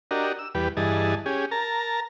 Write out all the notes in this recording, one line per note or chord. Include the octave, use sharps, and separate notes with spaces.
D4 F#4 G4 A#4 D#5
E6
E2 G3 G4 B4
G2 E3 G#4 D#5 A5
C#4 G4 G#4
A#4 A5 A#5